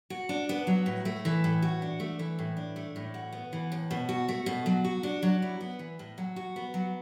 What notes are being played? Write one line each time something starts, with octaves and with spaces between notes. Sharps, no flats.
F#4
D4
B3
F#3
A2
A3
E3
A2
F#4
D4
A3
E3
A2
D4
A3
A2
F#4
B3
E3
A2
B2
F#4
A3
B2
F#3
F#4
D4
F#3
E4
B3
E3
A2
F#3
F#4
B3
F#3